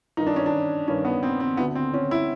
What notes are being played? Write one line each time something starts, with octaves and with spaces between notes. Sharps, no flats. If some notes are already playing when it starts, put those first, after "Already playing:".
G2 D#3 D#4
D4
C#4
D4
G2 D#3 C#4
B3
C4
C4
D2 D3 B3
C4
C#4
E4